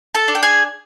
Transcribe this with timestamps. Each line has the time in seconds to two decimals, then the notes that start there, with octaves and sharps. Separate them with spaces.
0.15 A4 A5
0.28 D4
0.35 G5
0.43 G#4 G#5